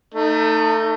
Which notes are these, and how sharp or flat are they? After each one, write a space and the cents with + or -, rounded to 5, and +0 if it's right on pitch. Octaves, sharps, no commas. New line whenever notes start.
A3 +25 D#4 -10